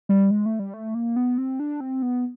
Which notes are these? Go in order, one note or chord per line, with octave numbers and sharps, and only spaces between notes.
G3
G#3
A3
G3
A3
A#3
B3
C4
D4
C4
B3